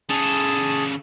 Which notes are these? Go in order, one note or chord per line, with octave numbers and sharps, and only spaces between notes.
C#3 G#4 A4 A5